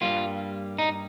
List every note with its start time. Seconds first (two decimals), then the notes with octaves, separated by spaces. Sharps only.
0.01 G2 G3 A#3 F4
0.78 D#4